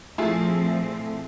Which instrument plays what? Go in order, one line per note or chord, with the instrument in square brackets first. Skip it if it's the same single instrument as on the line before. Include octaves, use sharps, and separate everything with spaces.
[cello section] A#2 F3 C4 [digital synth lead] A3 [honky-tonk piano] E4 F4 G#4